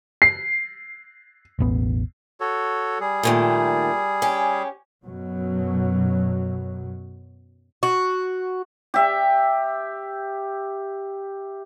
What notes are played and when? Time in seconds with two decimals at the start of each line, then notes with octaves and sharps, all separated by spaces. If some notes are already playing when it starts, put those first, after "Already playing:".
0.22 C7
1.59 E1 A1 B3
2.40 F#4 A4 C#5
3.00 G3 G#4
3.23 A#2 D#3 A3
4.22 C#4 G4
5.05 F#2 B2 F#3
7.83 F#4
8.94 G4 E5